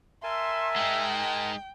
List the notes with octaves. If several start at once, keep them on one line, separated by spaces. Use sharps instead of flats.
A#4 E5 G#5 A5 C6
G#3 D#4 G5